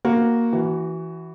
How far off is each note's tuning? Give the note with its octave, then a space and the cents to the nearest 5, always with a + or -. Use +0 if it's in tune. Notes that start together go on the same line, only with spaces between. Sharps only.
A#3 +0 F#4 +0
E3 +0 F#4 +25